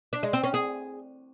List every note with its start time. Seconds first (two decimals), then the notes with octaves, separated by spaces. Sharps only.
0.13 D4
0.23 G#3
0.33 C4
0.44 C#4
0.54 G#4